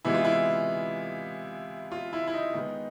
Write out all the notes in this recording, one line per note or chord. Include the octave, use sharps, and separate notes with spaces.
C3 E3 G#3 B3 E4
F4
E4
F4
E4
E4
D#4
D#3 G#3 B3